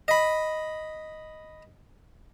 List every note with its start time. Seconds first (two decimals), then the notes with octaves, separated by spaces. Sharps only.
0.08 D#5 B5